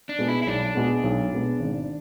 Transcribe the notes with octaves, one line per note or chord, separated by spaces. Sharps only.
D4
B2 G#3 B3
E4
E4
B1 D4
B2 G#3 B3
B1
B2 G#3 B3
G#1